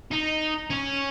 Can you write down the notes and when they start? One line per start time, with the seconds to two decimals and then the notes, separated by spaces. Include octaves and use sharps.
0.11 D#4
0.70 C#4